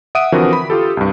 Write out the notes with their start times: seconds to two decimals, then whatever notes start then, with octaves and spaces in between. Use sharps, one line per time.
0.15 E5 F#5 D#6 D7 D#7
0.32 D3 E3 F3 C4 F#4 A#4
0.53 B5
0.70 F4 G4 A4
0.97 C2 G2